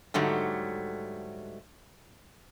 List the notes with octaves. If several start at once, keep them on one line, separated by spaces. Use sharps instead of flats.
G#2 D3 F#3 G3 A3